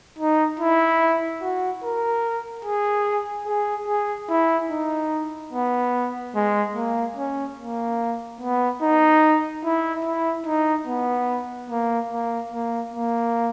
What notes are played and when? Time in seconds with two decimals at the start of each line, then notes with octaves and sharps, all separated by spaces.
0.19 D#4
0.60 E4
1.42 F#4
1.83 A#4
2.65 G#4
3.47 G#4
3.88 G#4
4.30 E4
4.71 D#4
5.53 B3
6.36 G#3
6.76 A#3
7.17 C#4
7.59 A#3
8.41 B3
8.82 D#4
9.65 E4
10.05 E4
10.46 D#4
10.87 B3
11.70 A#3
12.11 A#3
12.52 A#3
12.94 A#3